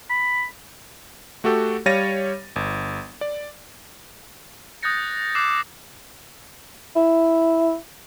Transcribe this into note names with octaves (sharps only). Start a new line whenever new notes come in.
B5
A3 F#4 G4 A4
G3 C#5 F5 A6 A#6 D#7
G1
D5
D#6 F#6 G6 A6 A#6 C#7
D6 E6 F#6 G6 C7 E7
E4